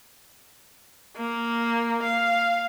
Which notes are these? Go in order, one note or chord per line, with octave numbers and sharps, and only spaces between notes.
A#3
F5